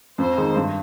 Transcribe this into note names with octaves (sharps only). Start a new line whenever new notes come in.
F2 C5
D#3 G#3 D#4
G2